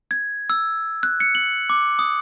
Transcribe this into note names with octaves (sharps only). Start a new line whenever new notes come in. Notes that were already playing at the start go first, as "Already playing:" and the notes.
G#6
E6
F#6
C#7
F#7
D6
D#6